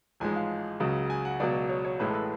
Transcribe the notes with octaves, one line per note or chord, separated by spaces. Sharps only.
A1 G#2 F3 G#3 G#5
F5
C#2 C#3 F#3
G#5
F#5
C#2 B2 F#3 D5
C#5
C#5
A1 A2 G#3 B4
A4
B4